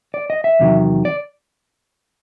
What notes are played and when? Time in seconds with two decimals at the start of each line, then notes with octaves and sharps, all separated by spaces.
0.14 D5
0.30 D#5
0.44 E5
0.59 E2 C3 D#3 F#3
1.05 D5